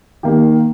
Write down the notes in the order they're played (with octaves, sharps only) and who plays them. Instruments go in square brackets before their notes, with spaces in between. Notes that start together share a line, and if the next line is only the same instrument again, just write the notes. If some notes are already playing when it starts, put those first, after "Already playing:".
[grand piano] D#3 A#3 G4